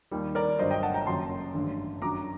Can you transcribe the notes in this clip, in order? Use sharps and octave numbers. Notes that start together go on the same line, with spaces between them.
D#2 D#3 G3
A#4 D5
G1 G2 F#3 C5 D#5
D#5 G5
F#5 A5
G5 A#5
F#1 F#2 F#3 A5 C6
A1 G2 D3
F#2 D3 F#3 A#5 D6